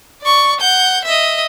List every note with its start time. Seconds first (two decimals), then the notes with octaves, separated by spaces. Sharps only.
0.22 D5 C#6
0.60 F#5 G6
1.04 D#5 E5